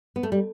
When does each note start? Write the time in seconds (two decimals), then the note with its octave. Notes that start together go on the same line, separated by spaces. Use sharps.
0.16 B3
0.23 A3
0.32 G3